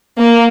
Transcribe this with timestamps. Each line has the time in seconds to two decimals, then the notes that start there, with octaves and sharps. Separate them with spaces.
0.18 A#3